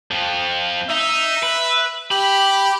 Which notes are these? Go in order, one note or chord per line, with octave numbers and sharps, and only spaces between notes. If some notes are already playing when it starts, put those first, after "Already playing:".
F2 F3
D#4 E5
B4
G4 B5